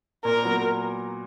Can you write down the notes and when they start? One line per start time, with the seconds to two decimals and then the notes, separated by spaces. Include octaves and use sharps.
0.24 A#2 A#4
0.44 F#3 B3